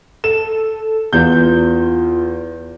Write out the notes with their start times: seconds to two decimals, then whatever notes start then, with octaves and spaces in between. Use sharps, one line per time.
0.24 A4 E7
1.13 E2 F4 G6